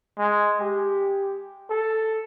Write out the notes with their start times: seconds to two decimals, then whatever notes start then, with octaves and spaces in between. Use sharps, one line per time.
0.19 G#3
0.61 G4
1.70 A4